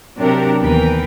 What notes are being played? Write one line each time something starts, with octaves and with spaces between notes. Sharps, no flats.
C3 F#3 D4 G4 A#4
D#2 E3 B3 A#4 B4 G5